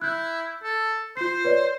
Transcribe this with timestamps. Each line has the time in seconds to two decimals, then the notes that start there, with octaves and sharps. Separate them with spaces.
0.01 E4 F#6 G6
0.63 A4
1.17 F4 C5 C7
1.45 B4 C#5 D5